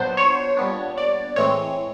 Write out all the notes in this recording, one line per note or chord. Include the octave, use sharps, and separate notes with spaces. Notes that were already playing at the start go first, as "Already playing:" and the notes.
Already playing: A#2 F#3 B3 D4 C5
C#5
A#2 G3 B3 D4
D5
A2 E3 G#3 C4 C#5